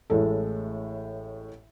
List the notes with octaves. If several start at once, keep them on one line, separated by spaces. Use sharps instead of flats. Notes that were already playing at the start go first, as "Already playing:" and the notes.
A1 A2 G#3 A4